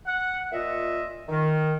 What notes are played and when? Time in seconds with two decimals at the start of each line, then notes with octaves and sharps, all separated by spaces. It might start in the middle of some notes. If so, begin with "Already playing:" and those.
0.06 F#5
0.52 A#2 F4 D#5 E5
1.29 D#3